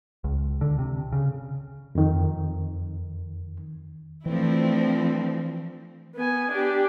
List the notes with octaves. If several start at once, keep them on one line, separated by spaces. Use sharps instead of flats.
C#2
D3
C3
C#3
F2 D#3
E3 F3 A3 C4 D4 E4
B3 G#5
D4 G4